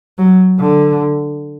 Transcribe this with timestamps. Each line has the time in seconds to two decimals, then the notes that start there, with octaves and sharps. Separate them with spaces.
0.18 F#3
0.59 D3